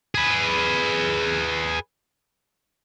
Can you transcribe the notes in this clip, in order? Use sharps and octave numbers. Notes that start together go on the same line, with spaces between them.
G#4 B4